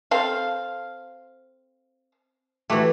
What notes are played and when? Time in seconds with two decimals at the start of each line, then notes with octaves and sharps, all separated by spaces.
0.11 C4 A4 F5
2.70 E3 A3 F#4 G4